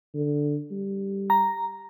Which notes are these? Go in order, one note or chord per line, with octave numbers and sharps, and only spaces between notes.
D3
G3
A#5